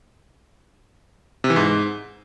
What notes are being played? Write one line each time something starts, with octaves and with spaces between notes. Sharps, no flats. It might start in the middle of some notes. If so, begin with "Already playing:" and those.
C3
E3
G#2